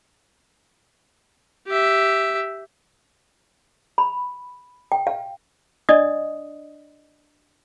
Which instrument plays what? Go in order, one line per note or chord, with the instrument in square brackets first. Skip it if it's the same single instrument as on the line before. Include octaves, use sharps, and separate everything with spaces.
[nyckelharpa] G4 E5
[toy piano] B5
G5
F5
D4 D5 D#5 D#6